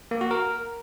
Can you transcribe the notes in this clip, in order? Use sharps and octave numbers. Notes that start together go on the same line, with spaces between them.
A#3
F#4
A#4